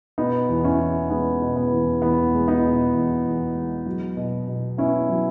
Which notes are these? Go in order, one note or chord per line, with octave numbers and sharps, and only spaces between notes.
B2 B3 D#4
E2
C#4 E4
E2
G#3 B3 D#4
B2
B3
E2
E2 B3
G#3
B3 D#4
B2
E2
E2
G#3
F#3
B2
B2
B3 C#4 E4
F#3